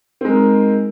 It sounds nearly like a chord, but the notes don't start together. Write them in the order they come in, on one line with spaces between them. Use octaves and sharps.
C4 G#3 A#4 D#4